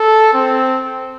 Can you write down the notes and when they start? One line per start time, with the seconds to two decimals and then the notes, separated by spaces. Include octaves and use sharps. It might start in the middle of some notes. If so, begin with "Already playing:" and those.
Already playing: A4
0.33 C4